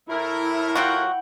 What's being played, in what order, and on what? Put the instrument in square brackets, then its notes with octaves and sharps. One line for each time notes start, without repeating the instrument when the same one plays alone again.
[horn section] A2 A#4 [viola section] E4
[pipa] F#3 F4 F#4 [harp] F#5 G5